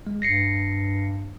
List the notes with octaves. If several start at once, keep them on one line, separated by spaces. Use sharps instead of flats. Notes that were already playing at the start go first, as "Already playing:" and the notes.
G#3
G2 A#6 C7 C#7